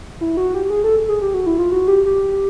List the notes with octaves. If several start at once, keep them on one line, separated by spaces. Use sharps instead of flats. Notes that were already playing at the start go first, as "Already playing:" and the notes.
E4
F#4
G4
G#4
A4
G#4
G4
F#4
E4
F4
F#4
G4
G4